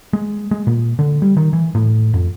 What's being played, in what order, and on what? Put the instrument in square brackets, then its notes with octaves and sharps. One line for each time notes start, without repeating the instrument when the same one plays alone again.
[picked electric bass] G#3
G#3
A#2
D3
G3
D#3
E3
A2
F2